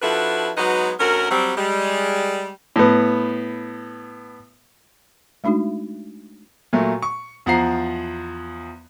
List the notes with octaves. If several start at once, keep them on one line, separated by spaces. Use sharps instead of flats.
F3 D4 E4 F#4 A4 B4
F#3 G#3 B3 D#4 F#4 B4
D2 C#4 F#4 A#4
F#3 G3 C4
G3 G#3
A2 B3
G#3 A3 D4 D#4 F#4
A#2 F#3 A3
C#6
E2 F3 F#5 A#5 C7